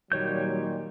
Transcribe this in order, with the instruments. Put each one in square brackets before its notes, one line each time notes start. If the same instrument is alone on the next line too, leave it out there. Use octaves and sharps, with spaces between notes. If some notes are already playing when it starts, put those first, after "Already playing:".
[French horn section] A#2 D#3 F#3 [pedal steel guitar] G3 C#5 G6